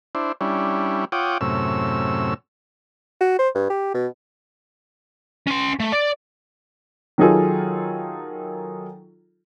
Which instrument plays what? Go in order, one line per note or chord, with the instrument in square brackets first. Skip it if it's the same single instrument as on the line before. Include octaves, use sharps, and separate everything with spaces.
[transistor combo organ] D4 E4 C5
G3 C#4 D4 E4
F4 C#5 F#5 G5 D6 D#6
F#2 A2 C3 C#4 E6
[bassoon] F#4
C5
G2
G4
B2
[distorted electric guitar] C#4 C6
A3
D5
[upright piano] D#3 F#3 D#4 F4 G#4 A4